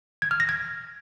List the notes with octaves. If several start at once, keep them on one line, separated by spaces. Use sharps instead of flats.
G#6
F6
A#6
G#6